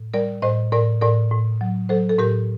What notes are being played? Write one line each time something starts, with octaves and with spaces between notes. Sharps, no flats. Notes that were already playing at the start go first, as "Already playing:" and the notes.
Already playing: A2
G3 A#4 D5
A2 C5 D#5
A2 A#4 D5
A2 A#4 D5
A2
F#3
F#3 A4 C5
A4
A2 G4 A#4